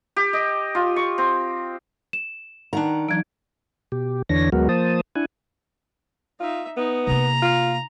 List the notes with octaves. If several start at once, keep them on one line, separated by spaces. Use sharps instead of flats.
G4
D#5
F4
C#6
C4
E7
D#3 D4 F#5 A#5
E3 F#3 D#4 G#6 D7
B2 G4
E2 D3 E3 D4 C#5 A#6
D2 F#3 G#3 B3 F#4 A#4
F3 A#3 C5 A5 D#6
D4 E4 F#5 G#5
D#4 F4 E5
B3 D#4
C3 A#3 A#5
F4